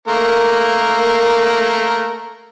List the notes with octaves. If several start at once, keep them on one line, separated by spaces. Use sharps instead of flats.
A3 A#3 A#4